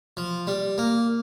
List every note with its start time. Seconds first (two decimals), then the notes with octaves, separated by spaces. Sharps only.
0.17 F3
0.47 G3
0.78 A#3